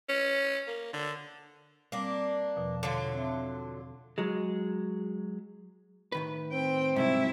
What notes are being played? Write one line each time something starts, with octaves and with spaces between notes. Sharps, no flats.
C#4
A#3
D3
G3 A#3 C4 D4
E2 B2 F3
D3 F#3 F4
C4 E5
F#3 G#3
A2 D#3 B4
C4 G5
G#2 C3 F#3 G3 E4